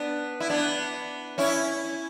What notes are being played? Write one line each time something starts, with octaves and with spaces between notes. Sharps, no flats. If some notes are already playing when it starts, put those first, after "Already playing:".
Already playing: B3 D4
E4
B3 D4
C#4 E4